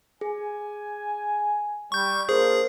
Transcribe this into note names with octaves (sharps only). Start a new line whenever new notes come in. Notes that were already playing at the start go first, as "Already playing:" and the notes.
G#4 G#5
G3 C#6 G6
A#3 D4 F4 G#4 A#4 C5